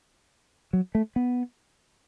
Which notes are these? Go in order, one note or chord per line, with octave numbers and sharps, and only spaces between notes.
F#3
A3
B3